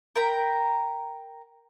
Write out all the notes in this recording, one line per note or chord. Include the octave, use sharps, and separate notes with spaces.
A#4 G5 A#5 B5